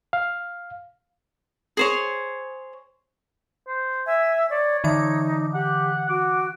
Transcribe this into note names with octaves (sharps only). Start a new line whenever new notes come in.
F5
G#4 C5 C#5
C5
E5 G#5
C#5 D5
D3 E3 D#4 D6
G4 F#5
F#4 D6